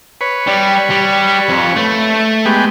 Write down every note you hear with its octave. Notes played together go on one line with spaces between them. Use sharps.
B4 C#5
G3
G3
F2
A3
G#3 B3 G4